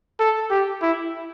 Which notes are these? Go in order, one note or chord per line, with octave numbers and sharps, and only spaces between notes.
A4
G4
E4